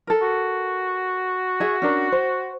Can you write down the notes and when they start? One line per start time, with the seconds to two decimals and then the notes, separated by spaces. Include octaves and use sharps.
0.07 A4 A#4
0.22 F#4
1.60 G#4 E5
1.82 C#4 D4 A#4
2.12 C5